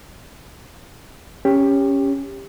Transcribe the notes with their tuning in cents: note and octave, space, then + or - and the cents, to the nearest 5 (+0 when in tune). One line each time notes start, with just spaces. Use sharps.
C#4 +0 G4 +15